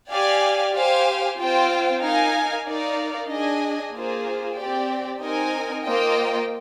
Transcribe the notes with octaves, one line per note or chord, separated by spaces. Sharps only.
G4 D5 F5 G#5
G4 C5 F5 G#5
C4 F4 C5 G5
D#4 A#4 F5 G#5
D#4 A#4 D5 F5
D4 G#4 D#5 G#5
A#3 F4 G#4 C5
C4 G4 D5 G5
C4 D#4 A#4 D#5 G#5
A#3 F4 C5 D#5 G5